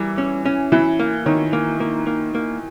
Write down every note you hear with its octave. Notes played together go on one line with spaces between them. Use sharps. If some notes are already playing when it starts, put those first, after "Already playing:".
Already playing: E3 G3 A#4
C#4
C#4
E3 E4
A#3
D#3 C#5
A#3
A#3
A#3
A#3